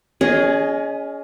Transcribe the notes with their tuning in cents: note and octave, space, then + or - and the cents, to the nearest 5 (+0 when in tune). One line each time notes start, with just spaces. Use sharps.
C#4 +30 G#4 +0 D#5 +0